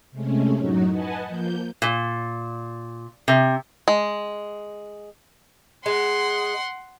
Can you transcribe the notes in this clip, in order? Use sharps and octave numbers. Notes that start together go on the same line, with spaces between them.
C3 G#3 A3 C#4
F#2 A2 F#3 D#4 F#4
B4 D#5 F#5 G#5 A5
F3 A#3 G6
A#2
C3
G#3
G#3 F#5 C6